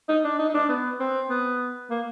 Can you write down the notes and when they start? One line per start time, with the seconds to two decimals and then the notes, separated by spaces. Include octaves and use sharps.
0.09 D#4
0.24 D4
0.39 D#4
0.49 D#4
0.54 D4
0.69 B3
1.00 C4
1.30 B3
1.90 A#3